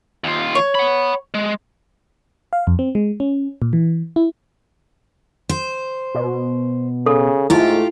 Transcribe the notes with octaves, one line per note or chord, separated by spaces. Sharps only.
D#2 F4
C#5
F#5 B5
G#3
F5
F2
C4
G#3
C#4
A#2
E3
E4
C5
B2
C#3 A4
G#2 A3 E4 F4 G4